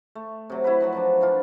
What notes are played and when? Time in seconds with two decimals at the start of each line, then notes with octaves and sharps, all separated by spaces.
0.15 A3
0.50 C3 F#3
0.64 E4 F#4 B4
0.80 F3 F#3 F#4
0.93 F3 F#3 D4
1.21 E3 D4 F4